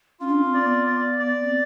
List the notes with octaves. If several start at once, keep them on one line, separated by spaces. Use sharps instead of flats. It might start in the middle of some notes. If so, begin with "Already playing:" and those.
C#4 F4
D4
C#4
C4
D5
B3
D5
D5
C4